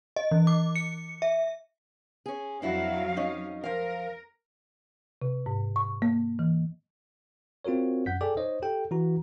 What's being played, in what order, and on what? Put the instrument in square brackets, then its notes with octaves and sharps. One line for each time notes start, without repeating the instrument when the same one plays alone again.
[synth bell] D#5
E3
D6
C#7
E5
[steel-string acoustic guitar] C#4 G#4
[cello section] F2 F#3 F5 [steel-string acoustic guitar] D4 E4 F#4
[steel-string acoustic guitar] C#4 D#4 D#5
[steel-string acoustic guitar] F3 F5 [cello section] A#4
[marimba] C3
G#2
C#6
A#3
E3
[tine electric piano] C4 F4 F#4 A#4 C#5
F#2 F#5 G6 B6
G#4 A4 D5 G5 G#5 D6
D#4 C5 C#5 D#5
G4 A4 G5
E3 F#4 A#5